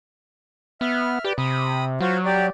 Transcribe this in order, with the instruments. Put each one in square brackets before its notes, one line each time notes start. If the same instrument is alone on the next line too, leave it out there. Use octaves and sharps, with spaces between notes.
[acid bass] B3 [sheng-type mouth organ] E5 F6
[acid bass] G4 [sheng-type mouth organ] B4 D5
[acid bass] C3 [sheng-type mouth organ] B5 D#6
[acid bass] F#3 [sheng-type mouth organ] F4 F#4 C5
[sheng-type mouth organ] G4 D5